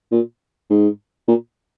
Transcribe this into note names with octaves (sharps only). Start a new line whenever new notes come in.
A#2
G#2
A#2